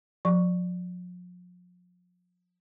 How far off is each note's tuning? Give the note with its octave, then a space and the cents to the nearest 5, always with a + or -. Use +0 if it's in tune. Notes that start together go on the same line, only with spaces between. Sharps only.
F3 +40 C#6 +0